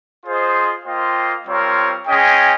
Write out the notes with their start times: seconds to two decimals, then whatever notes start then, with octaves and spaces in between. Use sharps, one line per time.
0.25 F4 G#4 C5 D#5
0.86 A#3 F4 C5 D#5 G5
1.46 G3 C4 F4 A#4 C#5
2.07 G#3 C#4 G#4 D#5 G5